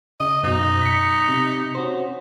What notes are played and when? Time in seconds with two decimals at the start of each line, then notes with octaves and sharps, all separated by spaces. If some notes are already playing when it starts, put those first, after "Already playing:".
0.20 C#3 D#5
0.43 F#2 B2 D#4
0.82 B6 C#7
1.29 C3
1.75 C#4 F#4 C5